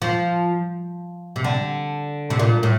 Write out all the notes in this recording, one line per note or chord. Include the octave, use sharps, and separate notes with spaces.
F3
C3
D3
C3
A#2
A2